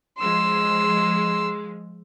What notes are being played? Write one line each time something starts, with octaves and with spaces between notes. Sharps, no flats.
F3 G#3 C6 E6